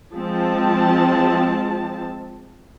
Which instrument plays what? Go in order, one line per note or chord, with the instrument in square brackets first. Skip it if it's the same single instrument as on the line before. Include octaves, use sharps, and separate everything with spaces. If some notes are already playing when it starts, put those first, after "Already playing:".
[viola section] F3 G#3 C4 A5